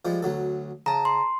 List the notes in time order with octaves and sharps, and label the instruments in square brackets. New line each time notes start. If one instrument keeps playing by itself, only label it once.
[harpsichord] F3 G3 G#3
D2 F#3 A4
[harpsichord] C#3 [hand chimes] A5 A#5
[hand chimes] C6